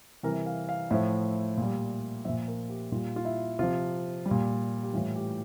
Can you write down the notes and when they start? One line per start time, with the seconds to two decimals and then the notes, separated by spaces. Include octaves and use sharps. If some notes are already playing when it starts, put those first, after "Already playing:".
0.23 C3 E3 G3 A#4
0.46 F5
0.69 F5
0.90 A2 F3 E5
1.57 A#2 G3
2.25 A#2 F3 E5
2.48 A#4
2.70 G4
2.92 A#2 G3 F4
3.16 F4
3.25 E4
3.59 C3 F3 F4
4.26 G3
4.31 A#2
4.83 G4
4.93 A2 E3 G3 F4
5.15 G4